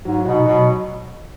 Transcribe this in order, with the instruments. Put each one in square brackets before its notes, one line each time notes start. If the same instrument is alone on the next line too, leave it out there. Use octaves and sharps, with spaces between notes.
[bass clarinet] G#2 [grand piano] F#3
[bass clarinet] B2 [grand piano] D#4 F#4
[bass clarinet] B2 [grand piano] F#3